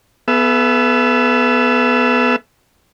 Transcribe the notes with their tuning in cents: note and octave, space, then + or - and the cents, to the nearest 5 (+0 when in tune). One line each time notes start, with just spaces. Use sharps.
B3 +0 A4 -40 E5 +25